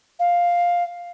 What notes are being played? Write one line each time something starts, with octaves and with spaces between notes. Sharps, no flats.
F5